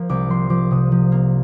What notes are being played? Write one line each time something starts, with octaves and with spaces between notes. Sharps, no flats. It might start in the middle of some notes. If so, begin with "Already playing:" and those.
Already playing: F3 A#3
C2 D6
F3 C6
F3 D6
C3 D#6
F3
A#3